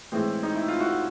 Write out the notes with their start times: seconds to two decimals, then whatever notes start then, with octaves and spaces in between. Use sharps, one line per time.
0.12 A2 E3 G#3 C4
0.43 D#4
0.55 E4
0.68 F4
0.80 E4 F#4